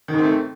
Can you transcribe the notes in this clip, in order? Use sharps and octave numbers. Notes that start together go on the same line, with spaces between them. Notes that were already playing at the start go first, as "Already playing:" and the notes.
G#2 D#3 A3 C4